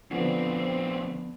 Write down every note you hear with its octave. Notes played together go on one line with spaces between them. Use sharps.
D2 D3 F3 B3 C4